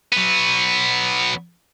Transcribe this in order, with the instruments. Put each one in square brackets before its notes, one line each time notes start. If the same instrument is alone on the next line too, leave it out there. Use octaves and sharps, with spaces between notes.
[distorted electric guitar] F#3 B3